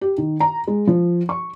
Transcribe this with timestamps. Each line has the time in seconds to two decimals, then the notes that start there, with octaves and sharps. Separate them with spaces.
0.01 G4
0.18 D#3
0.40 A#5
0.67 G#3
0.87 F3
1.29 C#6